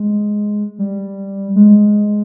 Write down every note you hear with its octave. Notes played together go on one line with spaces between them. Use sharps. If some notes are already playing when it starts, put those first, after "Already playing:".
Already playing: G#3
G3
G#3